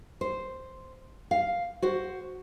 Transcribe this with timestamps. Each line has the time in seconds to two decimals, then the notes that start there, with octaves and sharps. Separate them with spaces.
0.21 C5
1.31 F5
1.82 F#4 C5